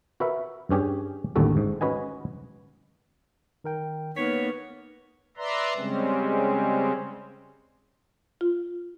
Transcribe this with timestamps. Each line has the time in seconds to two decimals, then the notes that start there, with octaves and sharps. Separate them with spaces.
0.20 F#4 A#4 B4 E5 F#5
0.71 G2 C#4 G4 G#4
1.36 A1 D#2 D3 G3 F#4 A4
1.57 G#2
1.81 C#4 F#4 B4 D#5 G#5
3.64 D#3 A#4 G5
4.16 A#3 B3 D#4 C#5 B6
5.37 B4 D5 E5 A#5 C6
5.77 C#3 G3 G#3 C4 C#4
8.41 F4